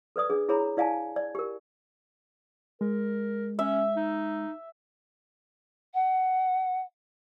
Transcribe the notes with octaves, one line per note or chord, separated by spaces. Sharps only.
A4 B4 D5 D#6
D4 G#4
E4 G#4 C#5 A#5 B5
E4 D5 F5 G#5 A5
D5
G4 A#4
G#3 A#4
C#4 E5
D#4
F#5